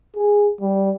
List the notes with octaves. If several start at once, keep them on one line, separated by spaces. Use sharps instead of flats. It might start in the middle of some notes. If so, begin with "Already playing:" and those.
G#4
G3